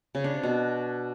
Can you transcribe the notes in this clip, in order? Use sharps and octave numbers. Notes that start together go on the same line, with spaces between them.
C#3
D4
C3
B2